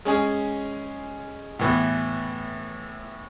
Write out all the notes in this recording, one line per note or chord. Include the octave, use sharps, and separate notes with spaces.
G#3 C#4 G#4
A2 E3 B3